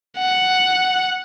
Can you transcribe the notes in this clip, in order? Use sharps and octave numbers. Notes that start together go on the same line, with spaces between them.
F#5